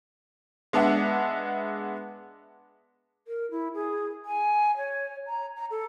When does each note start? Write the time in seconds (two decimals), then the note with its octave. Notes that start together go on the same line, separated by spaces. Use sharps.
0.73 G#3 B3 D4 E5 F#5
3.28 A#4
3.51 E4
3.74 G#4
4.25 G#5
4.77 C#5
5.27 A#5
5.56 A#5
5.71 A4